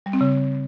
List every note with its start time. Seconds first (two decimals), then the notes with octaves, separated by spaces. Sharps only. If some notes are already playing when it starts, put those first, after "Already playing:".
0.06 G3
0.13 C4
0.21 C#3